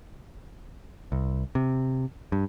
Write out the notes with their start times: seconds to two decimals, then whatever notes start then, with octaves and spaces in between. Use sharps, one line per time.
1.12 C2
1.55 C3
2.32 G2